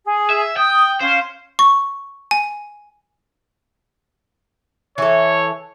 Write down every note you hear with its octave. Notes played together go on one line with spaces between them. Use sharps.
G#4
E5
G5 D#6
C#4 C5 F5
C#6
G#5
E3 A4 C#5